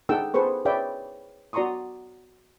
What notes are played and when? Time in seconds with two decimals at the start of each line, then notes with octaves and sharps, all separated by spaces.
0.09 D#4 G#4 A4 F#5 G5 E6
0.34 G#4 A4 B4 C5 C#6
0.65 G#4 B4 C#5 D5 E5 G5
1.53 F#4 D5 A#5 C6 C#6 D#6